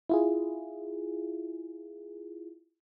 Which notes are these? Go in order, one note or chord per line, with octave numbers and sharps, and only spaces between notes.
E4 F4 G#4